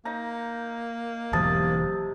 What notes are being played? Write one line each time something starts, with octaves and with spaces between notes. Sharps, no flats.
A#3 D#4 A#5
E1 C3 E3 F#3 A5 D#6 A6